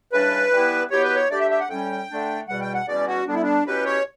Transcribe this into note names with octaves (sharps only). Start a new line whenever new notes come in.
C#3 E3 G3 D4 B4
E3 G3 B3 E4 G4
B2 F#3 B3 E4 G4 C#5
B4
C#5
D3 A3 D4 G4 D5
E5
E5
F#5
A2 G3 C#4 G5
D3 A3 D4
E2 B2 G3 F#5
G5
F#5
E2 B2 G3 C#4 D5
F#4
D3 G3 B3 D4
E4
D4
B2 F#3 C#4 E4 G4 B4
C#5